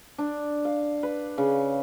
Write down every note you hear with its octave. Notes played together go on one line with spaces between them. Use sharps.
D4
F5
B4
C#3